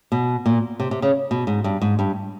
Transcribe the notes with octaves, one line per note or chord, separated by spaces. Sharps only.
B2
A#2
C3
C3
C#3
B2
G#2
G2
G#2
G2